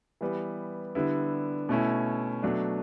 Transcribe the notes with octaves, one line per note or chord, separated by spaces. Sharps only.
E3 G3 B3
D3 G3 B3 E4
B2 A3 C#4 E4
B2 F#3 A3 D4